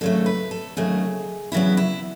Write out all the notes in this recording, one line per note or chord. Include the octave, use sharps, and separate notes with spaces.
D#2 C#3 F#3 A3 A4
B4
A4
D#2 C#3 F#3 A3 G#4
E2 C#3 F#3 B3 E4
E4